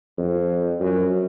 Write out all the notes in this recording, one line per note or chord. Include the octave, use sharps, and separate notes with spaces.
F2
F#2